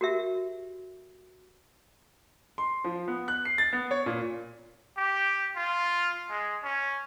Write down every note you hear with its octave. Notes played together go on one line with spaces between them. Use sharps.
F#4 G4 A#4 E5
C6
F3
B3
F#6
C7
A6
B3
C#5
A#2
G4
F4
G#3
C#4